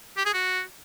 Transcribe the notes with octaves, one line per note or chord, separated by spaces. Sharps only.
G4
G#4
F#4